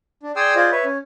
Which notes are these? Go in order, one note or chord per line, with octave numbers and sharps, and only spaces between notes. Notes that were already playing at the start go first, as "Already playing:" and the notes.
D4
G#4 D5 G5 C6 D#6 E6
F4 G#4 C5 D5 D#5
B4 C#5 E5
C#4